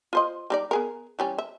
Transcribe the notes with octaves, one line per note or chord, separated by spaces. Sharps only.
F4 C5 D#5
G3 D#4 D5
B3 G#4 A#4
E3 G3 C#4
E5